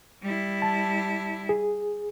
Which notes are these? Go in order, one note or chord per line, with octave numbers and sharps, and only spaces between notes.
G3 E4
A5
G#4